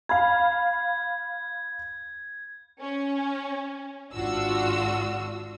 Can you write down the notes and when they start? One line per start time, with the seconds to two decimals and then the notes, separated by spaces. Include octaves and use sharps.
0.09 F5 B5 G#6
2.81 C#4
4.13 G#1 D4 F4 F#4 E6